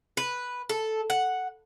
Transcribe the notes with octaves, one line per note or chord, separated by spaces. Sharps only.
B4
A4
F#5